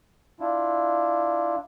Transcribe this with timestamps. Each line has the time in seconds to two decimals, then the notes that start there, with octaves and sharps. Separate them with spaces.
0.40 D4 E4 F4